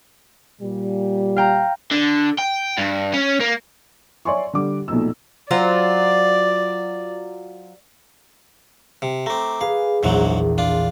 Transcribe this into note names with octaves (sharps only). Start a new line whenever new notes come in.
A#2 G3
F5 G5 A#5
D3
G5
G2
C#4
A#3
C#5 D5 E5 G#5 C6 C#6
D3 G3 D6
A#1 B2 A3 D#4 E6
F#3 F4 C5 D5
C3
A3 C4 A#5 D6
G#4 B4 F5
A#1 E2 G#2 E3 F#3
D4 F4